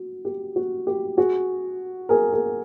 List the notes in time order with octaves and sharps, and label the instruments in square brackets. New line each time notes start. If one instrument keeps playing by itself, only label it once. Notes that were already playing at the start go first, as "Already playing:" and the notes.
Already playing: [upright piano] F#4
G4
F#4
G4
F#4 G#4
G#4 A#4
G#4 A#4